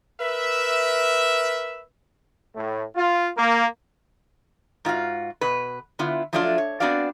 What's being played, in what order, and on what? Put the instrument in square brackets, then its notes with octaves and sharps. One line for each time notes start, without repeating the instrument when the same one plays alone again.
[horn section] A#4 B4 E5
A2
F4
A#3
[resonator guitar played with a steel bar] G#2 F4 F#4 F5
B2 B4
D3 B3 E4 F4
F3 F#3 A3 D4 E4 F4
C#5
B3 C4 D4 F#4 D5 F5